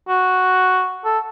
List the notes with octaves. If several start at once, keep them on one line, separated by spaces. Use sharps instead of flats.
F#4
A4